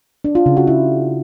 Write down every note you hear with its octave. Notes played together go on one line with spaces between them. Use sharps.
D4
F4
C#3
F#4
E4